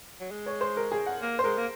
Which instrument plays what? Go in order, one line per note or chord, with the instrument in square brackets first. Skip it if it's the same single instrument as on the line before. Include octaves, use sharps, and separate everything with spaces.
[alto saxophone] F#3
G#3
[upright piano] C#5
C5
A#4
G#4
F#5
[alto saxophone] A#3
[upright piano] C5
[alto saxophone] G#3 [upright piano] A#4
[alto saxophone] A#3